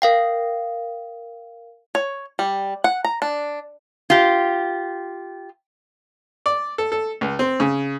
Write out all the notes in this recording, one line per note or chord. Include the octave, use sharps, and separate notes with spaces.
A#4 F5 G5
C#5
G3
F#5
A#5
D4
F4 G4
D5
A4
A4
C#2
C4
C#3